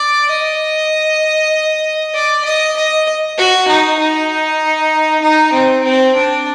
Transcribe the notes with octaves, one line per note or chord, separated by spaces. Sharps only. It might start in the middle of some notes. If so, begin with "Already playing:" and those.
Already playing: D5
D#5
D5
D#5
D#5
F#4
D#4
D#4
D#4
C4
C4
D4